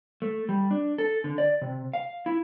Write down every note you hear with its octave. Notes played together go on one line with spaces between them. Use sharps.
A3
G3
D4
A4
D3
D5
C3
F5
E4